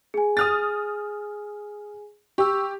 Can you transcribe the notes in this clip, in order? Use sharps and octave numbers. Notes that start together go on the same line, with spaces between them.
G#4 G#5
D#6 F6 A6
G4 C#6 E6